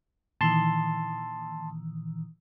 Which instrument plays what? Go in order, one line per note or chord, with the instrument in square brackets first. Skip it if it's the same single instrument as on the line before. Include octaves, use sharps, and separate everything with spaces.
[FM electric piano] A#2 D#3 E3 [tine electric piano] A5 C6